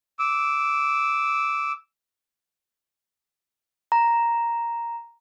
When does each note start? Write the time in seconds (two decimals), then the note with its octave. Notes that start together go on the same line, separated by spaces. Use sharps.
0.19 D6 E6
3.92 A#5